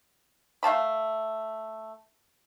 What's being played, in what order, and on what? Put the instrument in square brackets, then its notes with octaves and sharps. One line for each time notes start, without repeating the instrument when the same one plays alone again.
[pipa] A3 F5 A5 B5